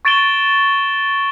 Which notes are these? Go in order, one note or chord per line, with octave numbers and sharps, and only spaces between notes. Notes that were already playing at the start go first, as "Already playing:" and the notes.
C#6 A6 D7 E7 G7